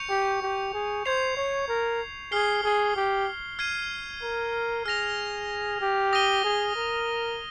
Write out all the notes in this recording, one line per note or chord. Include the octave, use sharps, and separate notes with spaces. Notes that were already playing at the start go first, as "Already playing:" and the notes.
Already playing: C#6 G6 C#7 F7
G4
G4
G#4
C5 G#6 C7 F7
C#5
A#4
G#4 F6 C7 G7
G#4
G4
F6 G#6 C7 D#7
A#4
G#4 F6 A#6 F7
G4
D#6 A#6 D#7 G7
G#4
A#4